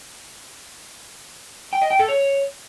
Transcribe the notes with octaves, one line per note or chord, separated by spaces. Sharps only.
G5
D#5
G5
A4
C#5